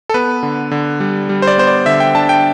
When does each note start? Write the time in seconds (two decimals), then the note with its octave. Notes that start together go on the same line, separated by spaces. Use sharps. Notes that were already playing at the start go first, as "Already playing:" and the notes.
0.09 A4
0.14 B3 B4
0.43 D3
0.71 D3
1.00 G3
1.29 G3
1.42 C5
1.47 D5
1.58 B3 C5
1.67 D5
1.86 D3 E5
2.00 G5
2.15 D4 A5
2.29 G5